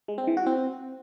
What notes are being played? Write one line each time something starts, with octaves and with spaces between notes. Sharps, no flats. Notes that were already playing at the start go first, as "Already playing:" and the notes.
G#3
C4
E3
F#4
C4